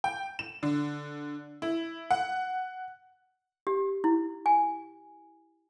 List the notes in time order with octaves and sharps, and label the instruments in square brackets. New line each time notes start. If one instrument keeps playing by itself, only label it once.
[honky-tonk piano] G5
E7
D3
E4
F#5
[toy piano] G4
E4
G#5